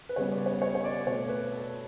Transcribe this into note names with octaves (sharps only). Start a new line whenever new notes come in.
B4
C#3 G3 B3 C#5
D5
C#5
C#5
C#5
D5
B2 A3 C#5
B4
A4